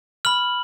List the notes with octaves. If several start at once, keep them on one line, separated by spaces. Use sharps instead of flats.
B5 F6 F#7